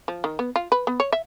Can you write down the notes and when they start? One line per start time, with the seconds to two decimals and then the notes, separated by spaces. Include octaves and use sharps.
0.08 F3
0.24 D#3
0.39 B3
0.56 F4
0.72 B4
0.87 B3
1.00 C#5
1.13 E5